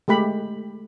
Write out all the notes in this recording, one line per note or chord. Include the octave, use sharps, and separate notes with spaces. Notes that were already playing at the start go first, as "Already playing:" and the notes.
G#3 A3 G4 B5